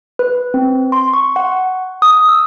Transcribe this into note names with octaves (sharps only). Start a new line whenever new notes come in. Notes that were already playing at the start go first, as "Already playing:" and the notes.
B4
C4
C6
C#6
F#5
D#6
E6